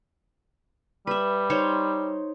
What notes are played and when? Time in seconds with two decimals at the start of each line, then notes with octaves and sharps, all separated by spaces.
1.07 G3 B4 E5
1.50 D#4 C5 C#5